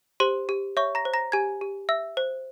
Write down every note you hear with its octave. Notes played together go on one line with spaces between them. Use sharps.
G4 C5 C6
G4
C#5 E5 C#6
A#5 A#6
C5
A#5 A#6
G4 G#5 G#6
G4
E5 E6
C5